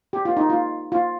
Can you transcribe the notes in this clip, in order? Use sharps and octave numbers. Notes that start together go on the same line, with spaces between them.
G4
F4
D#4
F4
F4